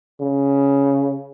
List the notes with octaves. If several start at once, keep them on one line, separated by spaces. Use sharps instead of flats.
C#3